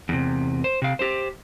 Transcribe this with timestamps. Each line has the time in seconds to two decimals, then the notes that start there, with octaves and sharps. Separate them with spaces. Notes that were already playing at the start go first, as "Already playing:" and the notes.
0.09 E2 C3
0.64 C5
0.82 C3 F5
0.99 G4 C5